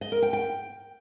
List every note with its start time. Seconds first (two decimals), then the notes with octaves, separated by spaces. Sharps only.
0.01 D#5
0.12 A#4
0.23 G5
0.33 G5